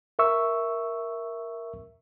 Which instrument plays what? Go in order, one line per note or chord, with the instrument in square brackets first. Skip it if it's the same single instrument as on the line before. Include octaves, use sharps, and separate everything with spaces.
[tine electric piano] A#4 E5 C#6 E6